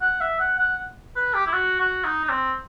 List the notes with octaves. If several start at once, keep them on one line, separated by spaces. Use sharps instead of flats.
F#5
E5
F#5
F#5
B4
G4
E4
F#4
F#4
D#4
D#4
C4